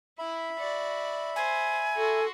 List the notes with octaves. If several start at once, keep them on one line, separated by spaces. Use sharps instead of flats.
E4 E5 B5
F#4 D5
C5 G#5
F#4 A4 C6